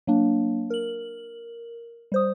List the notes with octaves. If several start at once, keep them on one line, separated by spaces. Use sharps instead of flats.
F#3 A#3 D4
A#4 F#7
G3 C5 D#6